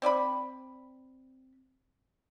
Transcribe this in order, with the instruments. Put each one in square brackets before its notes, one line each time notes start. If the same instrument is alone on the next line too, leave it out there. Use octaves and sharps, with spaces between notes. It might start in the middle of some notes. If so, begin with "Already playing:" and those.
[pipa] C4 D5 E5 B5